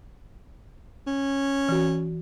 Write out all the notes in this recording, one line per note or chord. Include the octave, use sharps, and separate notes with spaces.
C#4
E3 F#4